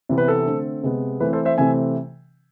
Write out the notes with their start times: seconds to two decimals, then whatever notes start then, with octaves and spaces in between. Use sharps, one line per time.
0.09 C3 E3 B3
0.18 B4
0.28 A4
0.46 D3 A3 C4
0.83 C3 G#3 B3
1.20 E3 A3 C4 B4
1.33 A4 C5
1.45 C5 E5
1.58 C3 E3 A3 C4 E5 G#5